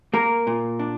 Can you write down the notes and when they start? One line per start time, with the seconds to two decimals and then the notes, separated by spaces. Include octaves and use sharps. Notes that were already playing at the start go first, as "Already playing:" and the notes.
0.14 A#3 A#4
0.47 A#2
0.79 D4